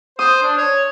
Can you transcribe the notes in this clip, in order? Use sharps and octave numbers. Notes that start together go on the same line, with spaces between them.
C5 D#6
D4
C#5